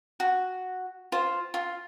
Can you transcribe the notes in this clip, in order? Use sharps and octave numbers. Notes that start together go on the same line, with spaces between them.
F#4
F4 C5
F4